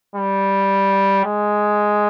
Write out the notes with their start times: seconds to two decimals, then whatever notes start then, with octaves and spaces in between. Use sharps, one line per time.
0.15 G3
1.25 G#3